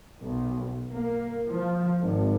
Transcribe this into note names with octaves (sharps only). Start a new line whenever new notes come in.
B1
A#3
F3
G#1